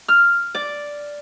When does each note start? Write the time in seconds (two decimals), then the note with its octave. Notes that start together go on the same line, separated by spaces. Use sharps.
0.08 F6
0.55 D5